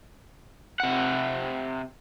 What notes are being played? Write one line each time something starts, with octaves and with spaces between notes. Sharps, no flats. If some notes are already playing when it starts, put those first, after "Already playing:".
C3 F#5